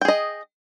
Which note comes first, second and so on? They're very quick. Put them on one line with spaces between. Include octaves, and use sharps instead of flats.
G5 G#4 D#5